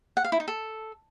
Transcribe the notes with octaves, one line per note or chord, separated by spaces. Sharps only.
F#5
F5
E4
D#4
A4